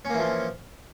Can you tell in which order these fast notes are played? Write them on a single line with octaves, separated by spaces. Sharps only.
C#4 A#3 E3 F3